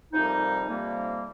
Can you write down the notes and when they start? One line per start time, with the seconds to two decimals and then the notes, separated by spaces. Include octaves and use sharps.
0.13 F2 C3 G3 A#3 D#4
0.69 F2 C3 G3 A#3